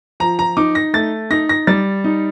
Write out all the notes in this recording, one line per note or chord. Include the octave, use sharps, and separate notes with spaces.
F3 A#5
A#5
D#4 D6
A#6
A3 A6
D#4 A#6
A#6
G3 A6
D#4